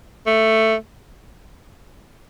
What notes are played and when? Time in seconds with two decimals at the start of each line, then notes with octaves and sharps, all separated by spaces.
0.27 A3